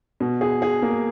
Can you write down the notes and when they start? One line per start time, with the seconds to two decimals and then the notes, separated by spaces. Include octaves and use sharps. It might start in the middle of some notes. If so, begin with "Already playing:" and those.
0.20 B2
0.41 G#4
0.62 G#4
0.82 A#3